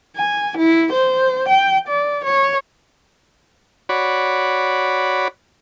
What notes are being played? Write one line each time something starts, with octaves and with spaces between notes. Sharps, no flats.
G#5
E4
C5
G5
D5
C#5
F#4 C#5 D5 B5